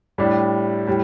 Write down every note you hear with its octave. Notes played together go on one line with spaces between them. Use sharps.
A2 G3 D4 G4
A2 G3